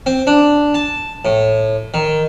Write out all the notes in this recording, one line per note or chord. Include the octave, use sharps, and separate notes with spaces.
C4
D4
A5
A2
D#3